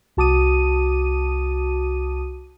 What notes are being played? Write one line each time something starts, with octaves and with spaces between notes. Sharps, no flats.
C2 F#4 A5 D6 D#6 D#7